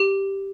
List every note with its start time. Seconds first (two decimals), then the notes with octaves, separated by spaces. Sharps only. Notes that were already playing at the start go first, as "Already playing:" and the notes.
Already playing: G4